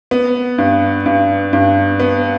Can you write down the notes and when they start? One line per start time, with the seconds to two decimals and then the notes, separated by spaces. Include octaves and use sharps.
0.11 B3
0.58 G2
1.06 G2
1.53 G2
2.00 B3